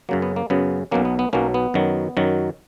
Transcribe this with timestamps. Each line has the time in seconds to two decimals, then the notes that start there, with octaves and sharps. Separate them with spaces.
0.09 F#2 C#3 F#3 A#3
0.22 B3
0.36 A#3
0.50 F#2 C#3 F#3 B3
0.91 B1 B2 F#3 A#3 C#4
1.05 B3
1.19 B3
1.33 B1 B2 F#3 A#3 C#4
1.54 B3
1.74 F#2 D#3 F#3
2.17 F#2 D#3 F#3